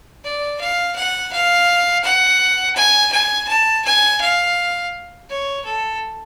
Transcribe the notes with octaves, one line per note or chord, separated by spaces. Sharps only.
D5
F5
F#5
F5
F#5
G#5
G#5
A5
G#5
F5
C#5
A4